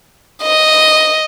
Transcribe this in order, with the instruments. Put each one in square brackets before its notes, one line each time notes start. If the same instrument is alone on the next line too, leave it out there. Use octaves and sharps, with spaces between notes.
[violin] D#5